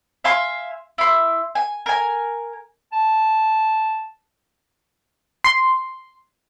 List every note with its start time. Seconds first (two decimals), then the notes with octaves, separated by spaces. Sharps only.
0.24 E5 F5 G#5 C6
0.98 E4 C6
1.55 G#5
1.86 A#4 G#5
2.93 A5
5.44 C6